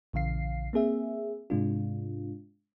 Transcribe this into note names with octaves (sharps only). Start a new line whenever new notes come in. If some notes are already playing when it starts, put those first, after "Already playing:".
A#1 C#3 E3 F5 C7
A#3 C4 G#4 E5
G#2 C3 G#3 D4 F4